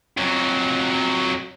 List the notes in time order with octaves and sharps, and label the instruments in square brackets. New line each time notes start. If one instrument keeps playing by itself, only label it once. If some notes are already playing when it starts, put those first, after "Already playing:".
[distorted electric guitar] F2 F#3